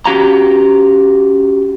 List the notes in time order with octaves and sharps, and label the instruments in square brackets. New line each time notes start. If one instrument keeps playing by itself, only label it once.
[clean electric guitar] C#4 F#4 G4 F5 A5 A#5